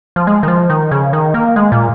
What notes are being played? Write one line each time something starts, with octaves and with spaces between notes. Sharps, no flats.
F3
G#3
D#3
F3
D#3
C#3
D#3
A#3
G#3
A#2